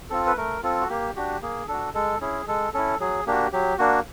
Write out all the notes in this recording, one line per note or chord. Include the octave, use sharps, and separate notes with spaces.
C4 F4 A4
B4
A3 A#4
C4 F4 A4
F#4
A#3 G4
D4 F#4 G4
A#3 G#4
D4 F#4 A4
G#3 A4
C#4 E4 G#4
G#3 A4
C#4 E4 A4
F#3 G#4
A#3 D4 F#4 G4
F#3 G4
A#3 D4 F#4